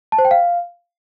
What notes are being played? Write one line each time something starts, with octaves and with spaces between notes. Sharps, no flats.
A5
C5
G5
F5